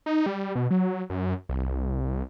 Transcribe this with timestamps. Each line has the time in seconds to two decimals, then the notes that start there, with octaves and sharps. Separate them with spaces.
0.06 D#4
0.26 G3
0.55 B2
0.71 F#3
1.10 F#2
1.49 C2